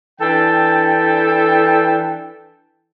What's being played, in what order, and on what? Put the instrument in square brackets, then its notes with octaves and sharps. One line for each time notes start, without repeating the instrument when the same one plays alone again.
[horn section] E3 D4 A4 G5